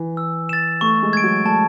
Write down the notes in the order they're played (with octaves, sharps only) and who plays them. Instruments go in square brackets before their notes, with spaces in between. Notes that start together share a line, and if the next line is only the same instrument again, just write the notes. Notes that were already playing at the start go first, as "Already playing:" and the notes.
Already playing: [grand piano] E3
[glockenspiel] E6
A6 E7
[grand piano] A3 [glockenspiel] C#6
[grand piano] G#3
[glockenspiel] G#6 D7
[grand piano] F#3
[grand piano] A3 [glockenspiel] A5